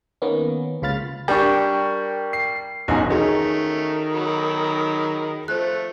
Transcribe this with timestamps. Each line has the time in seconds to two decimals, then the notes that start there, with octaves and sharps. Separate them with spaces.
0.22 D#3 A#3 B3 C#4
0.82 C#2 C#3 F4 B5 F6 A6
1.28 G3 D4 A#4 G5 C#6
2.33 C7
2.88 E1 B1 F#2 D#4 F#4 G#5
3.10 D#3 A3 C#4 D#4 F#4 G#4
4.13 F#3 B5
5.48 F3 A3 C5 F#6